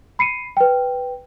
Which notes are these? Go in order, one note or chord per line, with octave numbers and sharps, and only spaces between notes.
B5 C7 C#7 D#7
B4 G5